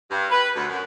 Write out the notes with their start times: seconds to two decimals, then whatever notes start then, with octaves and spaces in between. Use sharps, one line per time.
0.10 G2
0.30 B4
0.55 D2
0.68 F#2